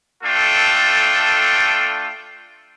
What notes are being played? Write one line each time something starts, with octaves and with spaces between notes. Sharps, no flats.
A3 D4 F4 A4 G5